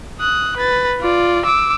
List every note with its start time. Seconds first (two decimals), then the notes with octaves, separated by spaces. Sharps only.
0.20 D#6 F#6
0.56 B4 A6
1.01 F4 D5
1.45 D6 E6